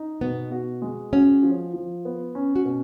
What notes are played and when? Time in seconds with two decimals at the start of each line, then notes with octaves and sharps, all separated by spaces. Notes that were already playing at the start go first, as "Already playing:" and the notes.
Already playing: D#4
0.21 B2 B3
0.52 F#4
0.82 G#3
1.13 C#4 F#4
1.43 F3
1.73 F3
2.05 B3
2.35 C#4
2.55 F#4
2.65 B2